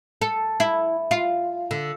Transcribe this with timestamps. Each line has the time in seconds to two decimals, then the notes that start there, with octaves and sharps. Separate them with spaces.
0.21 A4
0.60 E4
1.11 F4
1.71 D3